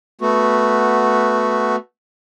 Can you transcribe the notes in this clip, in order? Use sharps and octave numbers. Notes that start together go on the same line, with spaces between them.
A3 B3 F#4